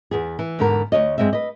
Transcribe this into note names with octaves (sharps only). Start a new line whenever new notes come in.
E2 B3 G#4
E3
E2 G#2 D3 B3 A#4
D2 B2 C#5 D#5
G2 E3 G#3 C4 D#5 E5
B4 D#5